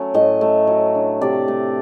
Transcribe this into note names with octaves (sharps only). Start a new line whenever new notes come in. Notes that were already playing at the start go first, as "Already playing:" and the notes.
Already playing: F#3 A3 C#4
A2 D#5
A3
F#3
D4
C3 D5
A3